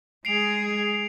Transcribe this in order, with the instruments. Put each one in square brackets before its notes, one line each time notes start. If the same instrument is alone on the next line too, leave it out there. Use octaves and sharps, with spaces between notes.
[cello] G#3 G#4 [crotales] C7 D7 F7